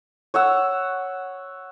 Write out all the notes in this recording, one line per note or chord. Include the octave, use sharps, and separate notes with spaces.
C#5 F#5 E6